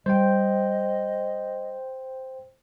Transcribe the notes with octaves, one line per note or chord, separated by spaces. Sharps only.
G3 C5 D#5 G5